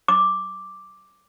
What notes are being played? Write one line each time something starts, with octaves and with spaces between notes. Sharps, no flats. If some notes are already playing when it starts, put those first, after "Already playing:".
D6